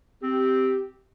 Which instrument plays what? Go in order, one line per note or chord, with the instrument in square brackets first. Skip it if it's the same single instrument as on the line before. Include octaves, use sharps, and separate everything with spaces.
[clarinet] C4 [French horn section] G4